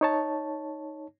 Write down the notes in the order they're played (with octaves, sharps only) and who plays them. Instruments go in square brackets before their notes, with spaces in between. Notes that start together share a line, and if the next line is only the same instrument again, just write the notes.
[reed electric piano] D#4 C#5 A5